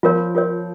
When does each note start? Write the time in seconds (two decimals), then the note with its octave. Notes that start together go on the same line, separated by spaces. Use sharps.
0.03 F3 F4 A#4 C#5
0.35 F4 A#4 C#5